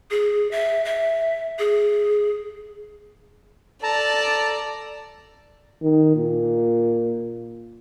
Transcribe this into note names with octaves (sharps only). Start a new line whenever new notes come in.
G#4
E5
E5
G#4
A4 D5 A5 A#5
D#3
A#2